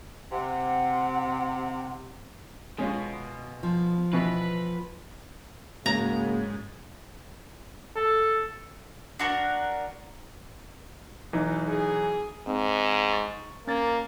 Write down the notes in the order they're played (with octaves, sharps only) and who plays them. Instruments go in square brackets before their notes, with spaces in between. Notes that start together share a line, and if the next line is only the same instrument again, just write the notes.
[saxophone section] C3 [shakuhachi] F#5
[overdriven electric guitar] B2 [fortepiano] G#3 C#4 F4
[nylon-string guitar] F3
[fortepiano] B2 E3 [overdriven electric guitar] B4
[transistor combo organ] G#2 [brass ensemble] C#3 F#3 [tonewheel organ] A#3 [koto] A#5
[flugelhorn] A4
[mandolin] D4 F#4 A#4
[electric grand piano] B1 E3 D#4
[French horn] G#4
[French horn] G#2 [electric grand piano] C4
[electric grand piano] C#6 A6
[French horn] A#3 [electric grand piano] C#4 G#6 A6